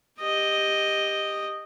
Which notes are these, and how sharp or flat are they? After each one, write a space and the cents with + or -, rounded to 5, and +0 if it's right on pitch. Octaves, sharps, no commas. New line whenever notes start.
G4 +10 D#5 +0